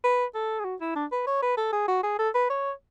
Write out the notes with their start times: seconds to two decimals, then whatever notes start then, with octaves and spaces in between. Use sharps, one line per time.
0.04 B4
0.35 A4
0.59 G#4
0.65 F#4
0.81 E4
0.95 D4
1.12 B4
1.27 C#5
1.42 B4
1.57 A4
1.73 G#4
1.88 F#4
2.03 G#4
2.19 A4
2.35 B4
2.50 C#5